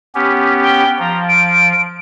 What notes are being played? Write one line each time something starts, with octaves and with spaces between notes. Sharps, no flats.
B3 C#4 G4
G5
F3 A#5
D7